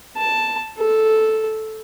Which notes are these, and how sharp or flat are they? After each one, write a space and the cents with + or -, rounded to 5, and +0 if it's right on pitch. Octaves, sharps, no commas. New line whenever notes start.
A5 +0
A4 -5